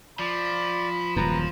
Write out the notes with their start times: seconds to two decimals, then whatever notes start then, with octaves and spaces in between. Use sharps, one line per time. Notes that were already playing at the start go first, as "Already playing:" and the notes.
0.19 F3 D5 B5
1.17 D#1 F#2 B4 A#5